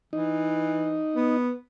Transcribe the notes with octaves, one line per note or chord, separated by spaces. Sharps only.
E3 D#4
B3